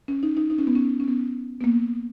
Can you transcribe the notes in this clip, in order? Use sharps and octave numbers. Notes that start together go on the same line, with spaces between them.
C#4
D#4
D#4
D#4
C#4
B3
C#4
C#4
B3
B3
A#3